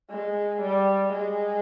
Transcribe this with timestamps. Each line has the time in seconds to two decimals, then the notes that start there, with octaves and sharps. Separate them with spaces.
0.10 G#3
0.61 G3
1.13 G#3